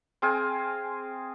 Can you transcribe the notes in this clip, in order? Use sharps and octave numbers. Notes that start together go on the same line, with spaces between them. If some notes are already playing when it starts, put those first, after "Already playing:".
C4 G#4 F5 G#5